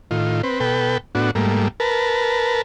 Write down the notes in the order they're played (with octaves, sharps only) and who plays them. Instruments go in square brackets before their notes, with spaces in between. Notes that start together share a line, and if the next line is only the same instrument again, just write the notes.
[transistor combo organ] A2 D#3 F4
C4 B4
B2 A4 B4 G5
A2 B3 D4 F#4
G#2 G3 A3 A#3
A#4 B4 A5